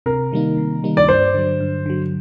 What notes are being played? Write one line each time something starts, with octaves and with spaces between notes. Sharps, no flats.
C3 A#4
D#3 G3 A#3 D#4
C3
D#3 G3 A#3 D#4
D5
G2 C5
D3 F#3
G2
D3 F#3